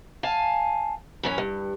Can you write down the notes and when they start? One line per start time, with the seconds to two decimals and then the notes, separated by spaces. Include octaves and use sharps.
0.23 F5 G#5 A5
1.23 F#2 E3 C#4
1.38 G2